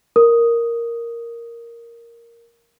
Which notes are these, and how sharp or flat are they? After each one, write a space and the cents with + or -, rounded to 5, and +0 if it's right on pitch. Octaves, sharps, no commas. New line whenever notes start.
A#4 +0 D#6 +0